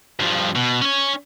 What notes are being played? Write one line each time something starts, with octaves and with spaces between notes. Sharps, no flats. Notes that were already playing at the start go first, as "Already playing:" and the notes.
G2 F3
B2
C#4 C#5